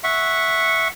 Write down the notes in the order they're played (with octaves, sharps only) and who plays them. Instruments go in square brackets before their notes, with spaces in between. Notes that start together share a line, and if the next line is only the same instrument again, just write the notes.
[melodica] E5 F#5 C#6